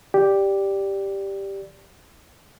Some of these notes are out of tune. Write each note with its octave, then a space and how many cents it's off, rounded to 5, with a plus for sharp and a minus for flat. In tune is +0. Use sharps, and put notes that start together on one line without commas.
G4 +0 D5 +0